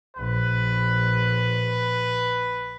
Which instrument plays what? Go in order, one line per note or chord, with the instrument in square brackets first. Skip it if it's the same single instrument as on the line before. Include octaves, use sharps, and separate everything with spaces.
[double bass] A#1 [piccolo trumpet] B4